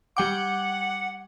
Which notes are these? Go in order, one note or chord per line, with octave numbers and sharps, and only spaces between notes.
G3 F#5 G5 D6